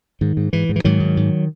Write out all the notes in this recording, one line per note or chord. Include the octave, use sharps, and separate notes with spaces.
G#2 D#3
G#2
G#2 E3
G#2
E3
G#2 D#3 F#3
G#2
G#2